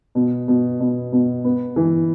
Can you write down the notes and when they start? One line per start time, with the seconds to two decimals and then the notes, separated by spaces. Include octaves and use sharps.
0.15 B2
0.48 B2
0.80 B2
1.12 B2
1.44 B3
1.76 E3